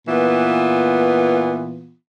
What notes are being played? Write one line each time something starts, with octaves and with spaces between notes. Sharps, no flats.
A#2 E3 B3 F4